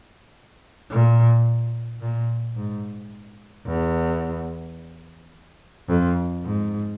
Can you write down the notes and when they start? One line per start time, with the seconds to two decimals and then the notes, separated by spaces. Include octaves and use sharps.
0.91 A#2
2.01 A#2
2.56 G#2
3.67 E2
5.89 F2
6.44 G#2